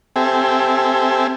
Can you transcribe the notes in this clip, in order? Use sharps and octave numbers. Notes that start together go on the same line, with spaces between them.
C4 G4 A4 E5 G#5